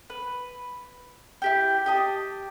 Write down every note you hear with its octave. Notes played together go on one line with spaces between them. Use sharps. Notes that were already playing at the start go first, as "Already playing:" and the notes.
B4
E4 G4 G5
G4 D#5 A5